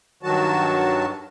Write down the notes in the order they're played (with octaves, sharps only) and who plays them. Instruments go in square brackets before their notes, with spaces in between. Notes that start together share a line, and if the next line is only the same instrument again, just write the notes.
[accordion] G2 D#3 F#3 F#4 A5